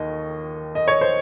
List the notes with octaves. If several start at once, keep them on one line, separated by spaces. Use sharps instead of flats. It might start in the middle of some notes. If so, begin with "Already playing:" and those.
Already playing: D#2 D#3 D#5
D#5
C#5
C5